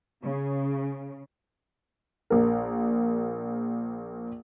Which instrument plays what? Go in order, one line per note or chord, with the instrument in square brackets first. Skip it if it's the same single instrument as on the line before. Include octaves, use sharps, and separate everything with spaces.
[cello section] C#3
[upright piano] A#1 A#4